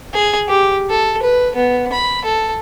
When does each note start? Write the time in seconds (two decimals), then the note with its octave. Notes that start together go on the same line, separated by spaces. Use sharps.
0.14 G#4
0.48 G4
0.89 A4
1.22 B4
1.55 B3
1.92 B5
2.25 A4